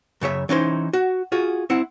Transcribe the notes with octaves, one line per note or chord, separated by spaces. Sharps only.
F#2 C#3 C#5 E5
E3 C#4 D#4 C5
F#4
F4 F#4 G#4
C4 E4 F#5